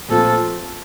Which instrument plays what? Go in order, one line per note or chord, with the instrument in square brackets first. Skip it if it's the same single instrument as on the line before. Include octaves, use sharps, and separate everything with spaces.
[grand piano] A#2 F3 A3 C4 F4 [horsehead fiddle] A4